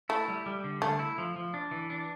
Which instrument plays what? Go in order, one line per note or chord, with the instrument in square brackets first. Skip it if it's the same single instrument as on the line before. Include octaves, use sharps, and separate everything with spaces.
[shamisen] A3 [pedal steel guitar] E4
[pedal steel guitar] G3
G3
D3
[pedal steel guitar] D3 [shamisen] A3
[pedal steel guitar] E4
F3
F3
D4
E3
D4